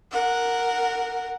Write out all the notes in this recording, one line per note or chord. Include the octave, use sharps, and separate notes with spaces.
A#4 F#5